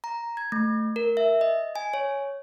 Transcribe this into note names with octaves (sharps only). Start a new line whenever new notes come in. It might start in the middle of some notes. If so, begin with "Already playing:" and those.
A#5
G#6
A3
A#4
E5
D#5
G#5
C#5